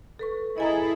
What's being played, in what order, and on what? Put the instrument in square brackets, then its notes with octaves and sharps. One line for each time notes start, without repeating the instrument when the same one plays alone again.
[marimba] A4 B4 C#6
[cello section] E4 G#4 A4 [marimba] D#5 G#5 A#5